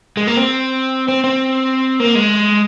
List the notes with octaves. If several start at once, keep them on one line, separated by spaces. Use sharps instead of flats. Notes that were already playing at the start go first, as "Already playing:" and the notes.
G#3
A#3
C4
C4
C4
A#3
G#3